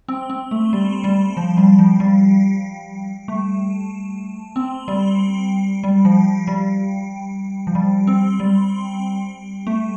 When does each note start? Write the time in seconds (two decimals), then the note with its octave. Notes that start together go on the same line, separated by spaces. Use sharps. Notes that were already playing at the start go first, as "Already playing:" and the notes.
0.08 C4
0.30 C4
0.51 A3
0.73 G3
1.04 G3
1.37 F3
1.58 G3
1.79 F3
2.00 G3
3.28 A3
4.56 C4
4.88 G3
5.83 G3
6.05 F3
6.47 G3
7.67 F3
7.75 G3
8.07 C4
8.40 G3
9.67 A3